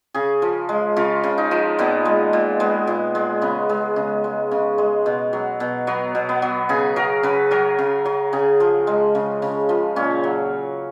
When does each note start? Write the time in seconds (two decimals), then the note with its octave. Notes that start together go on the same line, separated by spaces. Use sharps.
0.14 C#3 G#4
0.42 F3
0.69 G#3
0.96 C#3 F4
1.24 C#3
1.38 D#4
1.51 F3
1.79 A#2 B3
2.05 G#3
2.33 A#2
2.60 G#3 B3
2.87 A#2
3.15 G#3
3.42 C#3 B3
3.69 G#3
3.96 C#3
4.24 G#3
4.51 C#3
4.78 G#3
5.06 B2
5.33 F#3
5.60 B2
5.87 F#3 B3
6.15 B2
6.29 B3
6.42 F#3
6.69 C#3 G#4
6.96 F#3 A#4
7.23 C#3 B4
7.51 F#3 A#4
7.79 C#3
8.05 F#3
8.33 C#3 G#4
8.60 F3
8.87 G#3
9.15 C#3
9.42 C#3
9.69 F3
9.96 A#2 C#4
10.24 F#3